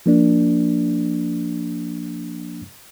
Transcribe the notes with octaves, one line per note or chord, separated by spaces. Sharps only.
F3 A#3 D4